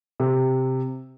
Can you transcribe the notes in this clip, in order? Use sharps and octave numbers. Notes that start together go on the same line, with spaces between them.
C3